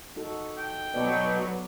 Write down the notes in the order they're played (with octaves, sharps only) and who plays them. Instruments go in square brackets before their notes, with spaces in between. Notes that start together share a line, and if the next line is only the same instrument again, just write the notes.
[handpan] D#4 F#4 A4
[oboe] G5
[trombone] B2 [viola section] F#3 B3 [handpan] D5